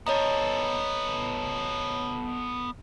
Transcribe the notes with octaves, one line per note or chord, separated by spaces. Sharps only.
B3 A4 C#5 D#5 A#5